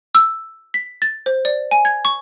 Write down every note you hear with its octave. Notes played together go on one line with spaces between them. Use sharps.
E6
B6
A6
C5
D5
G#5
G#6
C#6